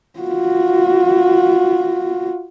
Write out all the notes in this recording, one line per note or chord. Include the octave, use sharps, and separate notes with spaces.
F4 F#4